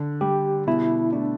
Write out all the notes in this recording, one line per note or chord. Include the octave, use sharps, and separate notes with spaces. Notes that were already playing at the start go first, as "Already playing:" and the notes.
Already playing: D3
G3 G4
B2 E4
A3 D4